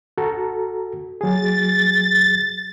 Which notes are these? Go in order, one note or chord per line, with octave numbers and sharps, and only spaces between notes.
F#4 A4 A#5
F#3 G#4 A6